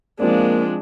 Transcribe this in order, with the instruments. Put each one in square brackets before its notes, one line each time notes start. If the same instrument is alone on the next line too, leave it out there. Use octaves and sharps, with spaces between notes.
[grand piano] F3 C4 D5 [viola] G#3 D4 [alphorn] A#3